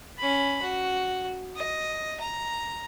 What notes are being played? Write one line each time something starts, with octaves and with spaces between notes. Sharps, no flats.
C#4 B5
F#4
D#5
A#5